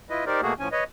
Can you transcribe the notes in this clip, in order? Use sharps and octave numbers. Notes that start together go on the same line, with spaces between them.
E4 F4 B4 D#5
D#4 G4 A#4 C5 D5
B2 A3 A#3 F#4 G#4
A2 F3 C#4 G#5
B4 C#5 D#5